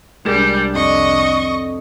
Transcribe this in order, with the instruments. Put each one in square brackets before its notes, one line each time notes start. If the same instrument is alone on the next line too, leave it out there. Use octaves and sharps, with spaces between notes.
[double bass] C2 D4 [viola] G3 [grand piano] G#3 A#4 E7
[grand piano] F2 [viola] D#5 C#6